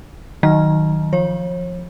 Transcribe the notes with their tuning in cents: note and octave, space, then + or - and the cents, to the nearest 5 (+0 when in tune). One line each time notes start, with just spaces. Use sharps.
D#3 +0 F#3 +0 A#5 +25
F3 +0 C#5 -40